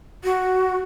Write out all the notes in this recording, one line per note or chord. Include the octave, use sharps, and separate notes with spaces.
F#4